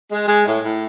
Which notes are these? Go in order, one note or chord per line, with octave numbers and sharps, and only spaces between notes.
G#3
G#3
A2
A2